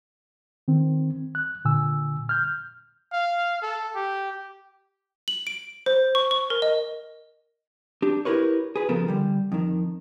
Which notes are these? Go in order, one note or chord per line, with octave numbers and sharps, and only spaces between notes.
D#3 C4
F#6
A#2 D3 G#5 E6
F6 G6
F5
A4
G4
F#7
D7
C5
C#6
C#6
A#4
D#5
D4 G4
E4 G4 A#4 B4 C#5
G#4 B4
C#3 F3 B3 A4 A#4
D3 G3
F2 D#3